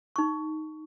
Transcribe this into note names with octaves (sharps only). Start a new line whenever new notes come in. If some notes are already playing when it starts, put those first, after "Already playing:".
D#4 C#6